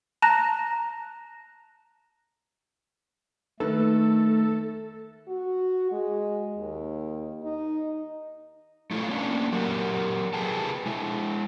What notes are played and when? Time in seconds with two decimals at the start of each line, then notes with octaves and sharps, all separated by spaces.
0.22 A5 A#5 F#6 A#6
3.60 D#3 A3 A4 B4
5.28 F#4
5.92 G#3
6.58 D#2
7.44 D#4
8.91 A3 E4 F4 A4 C#5 F5
9.09 A#3 C#4 D4
9.52 F#3 G4 A#4 F#5
10.33 G#4 A4 B4 F5 G5 A5
10.86 G#3 E4